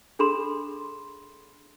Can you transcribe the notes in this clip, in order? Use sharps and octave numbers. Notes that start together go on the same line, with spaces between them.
D4 G#4 A4 B5 C6 E7